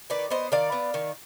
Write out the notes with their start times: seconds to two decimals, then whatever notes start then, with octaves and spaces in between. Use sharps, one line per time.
0.10 D#3 B4 D5
0.30 B3 C5 D#5
0.52 D#3 D5 F5
0.72 B3
0.94 D#3